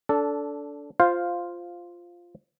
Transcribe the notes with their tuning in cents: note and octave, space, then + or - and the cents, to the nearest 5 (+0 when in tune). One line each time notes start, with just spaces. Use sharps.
D4 -25 A4 +0
F4 +0 C5 +0 F5 +5